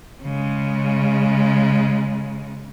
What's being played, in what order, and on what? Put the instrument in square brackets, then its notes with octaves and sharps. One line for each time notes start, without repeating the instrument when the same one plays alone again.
[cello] C#3 G#3